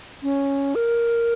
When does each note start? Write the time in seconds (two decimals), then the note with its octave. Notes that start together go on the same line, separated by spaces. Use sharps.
0.23 C#4
0.75 A#4